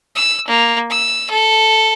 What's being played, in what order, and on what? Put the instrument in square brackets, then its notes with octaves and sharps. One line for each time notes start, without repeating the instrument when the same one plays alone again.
[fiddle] E6
A#3
E6
A4